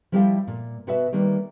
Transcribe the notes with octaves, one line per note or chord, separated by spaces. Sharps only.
F3 G3 E4 G4 C5 F5
A#2
B2 F#4 B4 E5
D#3 G3 A#3 B4